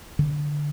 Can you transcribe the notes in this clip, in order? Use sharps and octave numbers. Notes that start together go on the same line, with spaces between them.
D3